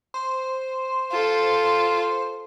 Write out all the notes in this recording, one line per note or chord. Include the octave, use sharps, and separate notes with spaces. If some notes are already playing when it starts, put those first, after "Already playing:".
C5
F4 A4